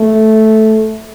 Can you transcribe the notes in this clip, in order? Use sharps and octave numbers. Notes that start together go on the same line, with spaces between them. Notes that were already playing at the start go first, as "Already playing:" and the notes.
Already playing: A3